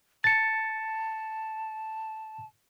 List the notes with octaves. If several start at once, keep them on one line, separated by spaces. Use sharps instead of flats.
A5 A6 C#7